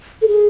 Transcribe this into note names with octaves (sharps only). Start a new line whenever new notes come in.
A4
G#4